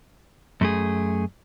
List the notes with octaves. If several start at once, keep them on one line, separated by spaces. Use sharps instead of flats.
F#2 A3 G#4